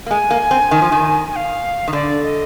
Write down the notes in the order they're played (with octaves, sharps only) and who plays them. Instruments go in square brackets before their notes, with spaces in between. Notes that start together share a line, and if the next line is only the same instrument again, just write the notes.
[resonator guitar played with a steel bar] A#3
[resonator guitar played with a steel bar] G#3 [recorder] G#5
[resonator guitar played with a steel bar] A#3
C4
D#3
F3
D#3
[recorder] G#5
F5
[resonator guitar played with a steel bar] D#3
[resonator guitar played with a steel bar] D3 [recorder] D5
[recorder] D#5